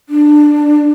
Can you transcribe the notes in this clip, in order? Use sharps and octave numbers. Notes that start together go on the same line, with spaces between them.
D4